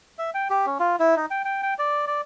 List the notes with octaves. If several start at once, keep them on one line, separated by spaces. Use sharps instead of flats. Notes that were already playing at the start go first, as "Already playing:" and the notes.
E5
G5
G4
C#4
F4
E4
D#4
G5
G5
G5
D5
D5